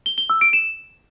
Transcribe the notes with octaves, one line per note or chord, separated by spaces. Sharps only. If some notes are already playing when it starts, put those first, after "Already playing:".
G7
G7
E6
D7
E7